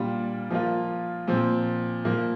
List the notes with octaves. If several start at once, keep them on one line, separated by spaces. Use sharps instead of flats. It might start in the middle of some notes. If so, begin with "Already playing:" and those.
Already playing: A#2 G3 D4 F4
F3 A#3 F4
A#2 F3 C4
A#2 F3 A#3